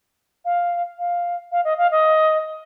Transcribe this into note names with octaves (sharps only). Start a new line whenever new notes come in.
F5
F5
F5
D#5
F5
D#5